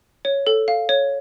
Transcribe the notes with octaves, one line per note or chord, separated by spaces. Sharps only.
C#5
A4
F5
C#5